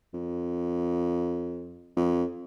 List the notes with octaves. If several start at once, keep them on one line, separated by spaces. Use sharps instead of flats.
F2
F2